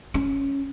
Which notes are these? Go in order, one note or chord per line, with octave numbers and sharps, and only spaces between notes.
C#4